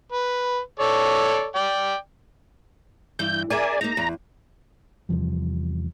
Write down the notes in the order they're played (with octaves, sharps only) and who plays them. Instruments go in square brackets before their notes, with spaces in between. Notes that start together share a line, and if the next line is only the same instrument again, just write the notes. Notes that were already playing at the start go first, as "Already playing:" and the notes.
[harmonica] B4
A4 C#5 D5
D5 G5
[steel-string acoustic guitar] G2 E3 [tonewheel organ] G6
[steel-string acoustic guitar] G#4 A#4 E5 [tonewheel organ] D5 G#5
[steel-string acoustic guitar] A#3 D#4 [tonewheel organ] A#5
[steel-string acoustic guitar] E2
[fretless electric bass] E2 C3 F3 G3